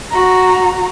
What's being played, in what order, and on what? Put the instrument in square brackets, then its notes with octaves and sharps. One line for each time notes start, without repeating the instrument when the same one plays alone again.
[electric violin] F#4 A#5